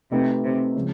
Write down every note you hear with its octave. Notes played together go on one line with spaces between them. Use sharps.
C3 A3 C4 D#4 G4 B4
C3
C#3 F3 G#3